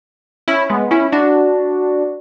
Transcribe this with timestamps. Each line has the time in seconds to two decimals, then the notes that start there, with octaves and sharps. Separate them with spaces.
0.48 C#4 E4
0.69 G#3 B3
0.91 C#4 E4
1.12 D4 F#4